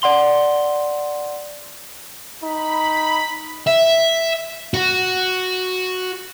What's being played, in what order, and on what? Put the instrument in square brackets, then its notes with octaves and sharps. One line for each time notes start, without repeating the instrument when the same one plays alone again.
[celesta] D5 F#5 C6 G7
[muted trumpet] D#4 [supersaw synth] B5
[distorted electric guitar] E5
F#4